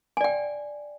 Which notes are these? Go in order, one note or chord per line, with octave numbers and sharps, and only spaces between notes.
D5 G5 G#5